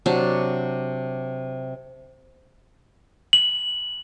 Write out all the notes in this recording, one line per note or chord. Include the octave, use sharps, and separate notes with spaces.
C3 F#3 D4
F#7